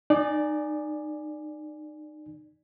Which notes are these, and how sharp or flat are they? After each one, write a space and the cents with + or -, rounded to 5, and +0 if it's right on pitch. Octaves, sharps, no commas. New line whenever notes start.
D#4 -30 D5 +0 G#5 +0